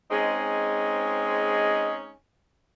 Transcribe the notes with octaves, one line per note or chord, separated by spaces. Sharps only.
G#3 C4 C#4 D#4 G#4